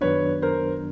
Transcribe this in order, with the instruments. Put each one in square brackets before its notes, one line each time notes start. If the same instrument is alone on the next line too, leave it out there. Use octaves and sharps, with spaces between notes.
[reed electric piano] F#2 D#3 F#3 B3 D4 [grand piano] B4 C#5
[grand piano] A#4 C5